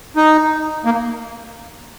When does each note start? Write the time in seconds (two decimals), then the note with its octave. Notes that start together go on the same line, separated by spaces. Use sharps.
0.16 D#4
0.85 A#3